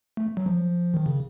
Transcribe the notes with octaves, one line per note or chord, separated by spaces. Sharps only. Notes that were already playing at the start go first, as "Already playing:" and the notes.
A3
F#3
F3
D#3
C#3